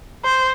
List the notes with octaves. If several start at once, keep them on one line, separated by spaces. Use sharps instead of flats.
C5